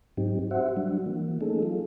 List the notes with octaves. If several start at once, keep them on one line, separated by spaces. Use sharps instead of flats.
G#2 F#3 C4 D#4 G4
F#4 G4 C5 E5 F#5
F#3 G3 D4 F#4
E3 A#3
A3 A#3 C#4 D#4 G#4 A4
F#3 F4